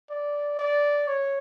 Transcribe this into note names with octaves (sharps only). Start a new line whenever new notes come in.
D5
D5
C#5